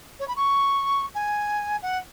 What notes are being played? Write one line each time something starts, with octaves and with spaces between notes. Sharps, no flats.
C#5
B5
C#6
G#5
F#5